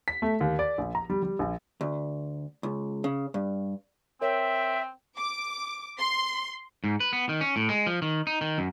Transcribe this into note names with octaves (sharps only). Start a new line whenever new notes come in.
B6
A3
D#2
D5
A#1
A#5
G3
G3
A#1
D2
C#2
C#3
G2
C4 A#4 C#5 E5 G5
D6
C6
G#2
B4
B3
D#3
C#4
A2
G#3
F3
D#3
D#4
D#3
F#2